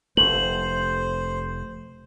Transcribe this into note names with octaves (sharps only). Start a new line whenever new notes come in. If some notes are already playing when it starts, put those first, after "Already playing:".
F1 A3 C5 F#7